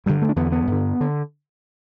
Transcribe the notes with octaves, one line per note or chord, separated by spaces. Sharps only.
G2 D3 G3
A3
D4
E2 D3 B3
B3
G2 D3
D3